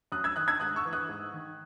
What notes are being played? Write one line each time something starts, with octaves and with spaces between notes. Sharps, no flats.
F#2 D#6 F#6
E6 G#6
D#3 D#6 F#6
E6 G#6
G#2 D#6 F#6
C#6 E6
E3
D#6 F#6
G#2
D#3